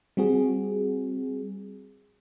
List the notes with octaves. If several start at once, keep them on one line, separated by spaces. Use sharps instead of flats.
G3 C4 F#4 G#4